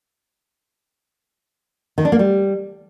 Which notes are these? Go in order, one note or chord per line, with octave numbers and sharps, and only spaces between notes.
D#3
D4
A#3
G3